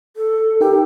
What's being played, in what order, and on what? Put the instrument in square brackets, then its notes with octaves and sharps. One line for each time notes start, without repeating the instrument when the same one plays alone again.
[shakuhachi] A4
[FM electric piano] D#4 A#4 G5 [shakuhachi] G4